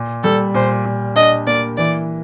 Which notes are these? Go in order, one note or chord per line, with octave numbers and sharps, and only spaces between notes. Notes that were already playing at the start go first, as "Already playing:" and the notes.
Already playing: A#2
G3 A4
A#2 C5
A#2
D4 D#5
A#3 D5
E3 D5